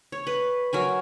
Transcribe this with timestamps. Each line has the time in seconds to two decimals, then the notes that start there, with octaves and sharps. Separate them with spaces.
0.12 C#5
0.27 B4
0.73 F#3 A#4 G#5